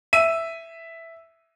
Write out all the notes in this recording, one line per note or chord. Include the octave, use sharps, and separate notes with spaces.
E5 D#7